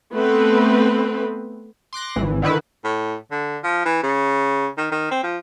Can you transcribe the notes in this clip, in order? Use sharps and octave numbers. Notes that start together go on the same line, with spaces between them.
A3 B3 C4 B4
C6 D6 F#6 A#6
G#1 E3
D3 D#3 E4 B4
A2
D3
F3
E3
C#3
D#3
D#3
C4
F3